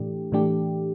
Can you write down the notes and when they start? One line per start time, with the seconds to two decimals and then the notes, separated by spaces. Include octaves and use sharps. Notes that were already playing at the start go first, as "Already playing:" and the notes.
Already playing: A2 E3 A3 D4 G4
0.32 A2 E3 A3 D4 G4